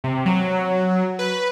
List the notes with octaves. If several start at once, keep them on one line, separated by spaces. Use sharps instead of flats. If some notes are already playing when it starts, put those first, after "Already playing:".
C3
F#3
B4